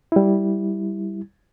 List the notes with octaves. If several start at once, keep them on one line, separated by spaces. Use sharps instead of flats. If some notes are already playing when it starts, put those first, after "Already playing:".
G3 E4